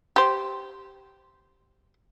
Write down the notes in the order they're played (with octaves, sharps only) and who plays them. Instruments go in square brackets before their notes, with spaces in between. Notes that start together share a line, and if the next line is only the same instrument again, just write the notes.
[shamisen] G4 C5